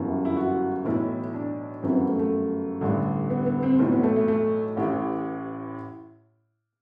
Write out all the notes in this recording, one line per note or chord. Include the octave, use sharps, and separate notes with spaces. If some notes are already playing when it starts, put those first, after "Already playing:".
Already playing: G1 F#2 E3
E4
F#4
B1 A2 E3 E4
D4
G1 F#2 E3 C4
B3
A3
A3
A1 G2 D3
B3
B3
C4
B1 A2 E3 C4
B3
A3
A3
A3
A1 A2 E3 G4